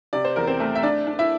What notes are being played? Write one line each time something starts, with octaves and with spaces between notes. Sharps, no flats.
C3 D5
C5
E2 A#4
C4 C5
A3
E5
D4 D5
D4
E4 E5